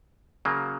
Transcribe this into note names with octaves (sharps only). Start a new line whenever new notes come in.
C#3 F#3 A#3